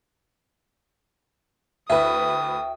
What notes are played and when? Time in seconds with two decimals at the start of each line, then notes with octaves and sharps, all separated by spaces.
1.90 D2 E4 B4 E5 G5 D#6